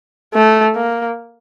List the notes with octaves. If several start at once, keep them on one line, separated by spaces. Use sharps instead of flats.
A3
A#3